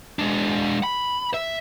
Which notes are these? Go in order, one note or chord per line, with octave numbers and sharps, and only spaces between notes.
G#3 D4
B5
E5